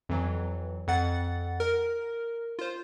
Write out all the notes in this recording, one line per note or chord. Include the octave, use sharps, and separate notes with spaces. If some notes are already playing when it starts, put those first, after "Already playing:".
F2 E3 F#3
F2 F#5 A6
A#4
F4 C5